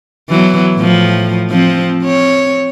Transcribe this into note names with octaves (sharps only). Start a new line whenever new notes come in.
E3 F#3 B3
A2 F3
F3 C4
C4 C#5